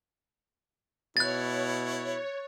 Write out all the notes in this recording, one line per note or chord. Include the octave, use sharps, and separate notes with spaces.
B2 E4 C#5 F#6 A6